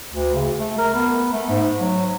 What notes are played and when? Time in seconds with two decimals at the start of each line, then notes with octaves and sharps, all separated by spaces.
0.12 D2
0.34 C#3
0.59 A3
0.78 A#4
0.94 B3
1.33 A3
1.50 G#2
1.80 F#3